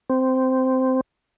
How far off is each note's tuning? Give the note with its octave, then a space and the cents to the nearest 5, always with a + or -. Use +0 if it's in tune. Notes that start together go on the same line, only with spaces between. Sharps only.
C4 -10